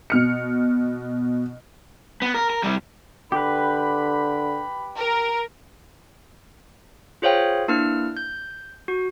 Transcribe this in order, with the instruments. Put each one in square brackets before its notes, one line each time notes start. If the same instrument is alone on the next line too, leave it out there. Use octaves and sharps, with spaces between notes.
[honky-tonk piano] B2 F6 C#7
[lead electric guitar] B3
A#4
A#4
C3 G3
[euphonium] D3 [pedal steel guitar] G4 B4 [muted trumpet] B5
[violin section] A#4
[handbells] F4 G#4 C5 C#5 F5 G5
A#3 D4 E4 B4 F6
G6
F#4